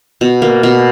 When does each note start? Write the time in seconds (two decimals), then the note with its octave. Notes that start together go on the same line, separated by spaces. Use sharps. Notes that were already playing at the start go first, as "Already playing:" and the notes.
0.21 B2
0.42 A#3
0.63 B2